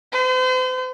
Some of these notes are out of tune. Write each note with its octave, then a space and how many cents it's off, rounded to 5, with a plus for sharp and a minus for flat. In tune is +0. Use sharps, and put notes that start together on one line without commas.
C5 -40